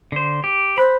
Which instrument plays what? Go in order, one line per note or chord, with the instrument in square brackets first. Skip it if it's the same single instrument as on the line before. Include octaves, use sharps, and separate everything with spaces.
[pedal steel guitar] D3 C5
G4
[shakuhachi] C5 [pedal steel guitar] B5 F#6